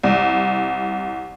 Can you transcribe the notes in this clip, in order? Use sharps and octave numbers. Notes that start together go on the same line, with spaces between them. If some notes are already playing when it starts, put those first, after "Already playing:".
C2